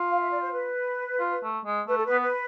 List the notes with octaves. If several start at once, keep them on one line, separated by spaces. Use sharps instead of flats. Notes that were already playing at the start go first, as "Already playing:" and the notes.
Already playing: F4
F5
E5
D5
C5
B4
F4
A3
G#3
A3 B4
A4
B3 B4
B4